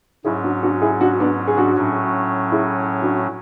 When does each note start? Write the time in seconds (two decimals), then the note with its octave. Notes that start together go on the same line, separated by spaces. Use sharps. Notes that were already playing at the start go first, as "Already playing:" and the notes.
0.24 G#2 F#3 C#4 E4 G#4
0.44 D4 F#4
0.63 D4 F#4
0.82 E4 G#4
1.00 D4 F#4
1.20 B3 D4
1.48 G#4
1.57 D4 F#4
1.76 A2 F#3 C#4
2.51 E4 G#4
3.02 D4 F#4